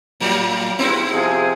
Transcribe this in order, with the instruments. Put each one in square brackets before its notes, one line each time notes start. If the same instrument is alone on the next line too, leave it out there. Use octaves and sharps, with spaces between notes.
[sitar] A2 F#3 G3
[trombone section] G#1 G2 [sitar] B3 C4 E4
[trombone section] C3 F3 G#4